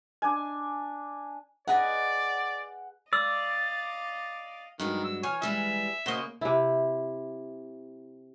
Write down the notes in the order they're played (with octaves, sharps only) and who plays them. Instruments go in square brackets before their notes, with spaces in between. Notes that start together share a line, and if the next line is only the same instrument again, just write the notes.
[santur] D4 G#5
[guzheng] G#4 B4 D#5 [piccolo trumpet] D5 [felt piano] F#5
[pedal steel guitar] D5 [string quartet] D#5 F5 [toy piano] E6
[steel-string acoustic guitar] G2 F#3 G#3 [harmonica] D#3
[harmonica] E6
[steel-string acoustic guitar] E3 [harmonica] C#5 [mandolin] G#5 F6
[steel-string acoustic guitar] E3 G3 G#3 [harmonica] E5
[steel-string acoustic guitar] C#3 A#3 [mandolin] F#4 C5 D#5
[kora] C3 E4